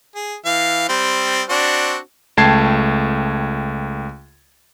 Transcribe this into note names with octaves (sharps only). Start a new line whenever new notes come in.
G#4
E3 F5
G3 C4
C4 D4 F#4
C#2 A3 G5 A5 G#6 C7